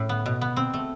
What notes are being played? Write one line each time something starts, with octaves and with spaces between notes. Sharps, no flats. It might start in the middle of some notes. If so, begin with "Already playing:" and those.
Already playing: A2 C#4
B3
B2
B3
C4
A3